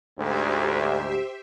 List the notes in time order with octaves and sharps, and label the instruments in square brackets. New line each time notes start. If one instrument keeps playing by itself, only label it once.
[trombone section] D2 G#2 [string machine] G4 C5 E5